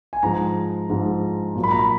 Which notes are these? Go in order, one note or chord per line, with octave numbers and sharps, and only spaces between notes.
G#5
G#2 F3 G#3 A#5
G#2 F3 G#3
A#2 F#3
B5
A#5
B5